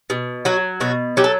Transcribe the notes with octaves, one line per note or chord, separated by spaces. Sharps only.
B2
F#3 F#4
B2 F#4
F#3 G4
A4